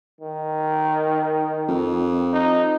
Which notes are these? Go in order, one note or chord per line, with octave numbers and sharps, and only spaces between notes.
D#3
F2
D#4